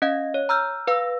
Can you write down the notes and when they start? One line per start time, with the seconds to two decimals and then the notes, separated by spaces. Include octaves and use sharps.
0.02 C#4 D#5 F5
0.34 C#5
0.49 A#5 E6 F6 G6
0.87 B4 F5 E6